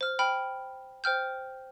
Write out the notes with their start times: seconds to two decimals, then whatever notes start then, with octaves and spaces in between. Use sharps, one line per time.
0.01 C5 F6
0.19 G5 B5 F6
1.04 C5 G5 F6 G6